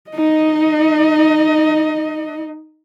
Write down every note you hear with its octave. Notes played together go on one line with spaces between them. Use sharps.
D#4 D#5